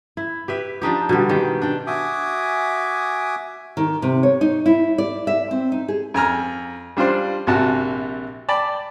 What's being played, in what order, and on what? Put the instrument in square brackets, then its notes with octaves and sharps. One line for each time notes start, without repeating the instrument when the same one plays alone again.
[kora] E4
G4 B4 E5
F3 D4 D#4 G4
B2 D3 G3
D#3 G#3 G4
D4 G5
[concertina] F#4 E5 G#5 D6 D#6
[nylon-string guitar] D#3
C3
C#5
D#4
E4
D5
E5
C4
D#4
G#4
[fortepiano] F2 G#5 A#5 F6
G3 D4 F4 C5
A#1 C3 F#4 A5
D5 G5 A5 B5